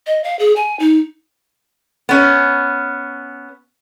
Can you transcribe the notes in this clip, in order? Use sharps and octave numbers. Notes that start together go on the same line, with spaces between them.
D#5
F5
G#4
G#5
D#4
B3 C#4